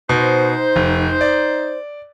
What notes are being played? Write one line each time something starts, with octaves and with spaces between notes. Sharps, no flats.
B2 D#4 C5
F1
D5